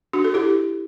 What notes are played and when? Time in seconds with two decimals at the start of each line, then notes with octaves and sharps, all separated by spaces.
0.13 D4 F#4
0.24 F#4 A4
0.34 E4 G4